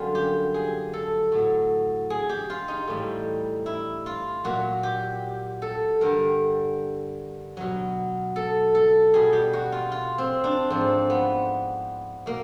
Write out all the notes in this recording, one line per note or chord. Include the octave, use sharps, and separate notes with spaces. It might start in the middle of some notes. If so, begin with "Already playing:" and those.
Already playing: F#2 D3 G3 F4
G4
G#4
A4
A2 F#3
G#4
G4
F4
D#4
A2 E3 G3
E4
F4
A#2 F#3 F#4
G4
A4
G2 D3 G3 A#4
B2 F#3
A4
A4
B2 G3 G#4
G4
F#4
F4
F4
C4
D4
G#2 F3 C4
B3
B2 A#3